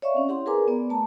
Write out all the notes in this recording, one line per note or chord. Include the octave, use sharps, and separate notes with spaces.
C#5 D5 E5 F5 C#6
C4 C#4
E4 G4 F#5 C6
G#4 A#4 B4 G#5 A#5 D6
B3 D5
A3 A5 A#5